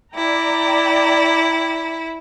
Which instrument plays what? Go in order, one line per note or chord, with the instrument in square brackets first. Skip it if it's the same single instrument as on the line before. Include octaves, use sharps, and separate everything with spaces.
[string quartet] E4 [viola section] D5 G5 A#5